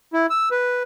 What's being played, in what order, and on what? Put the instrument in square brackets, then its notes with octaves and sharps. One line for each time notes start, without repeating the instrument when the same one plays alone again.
[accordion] E4
E6
B4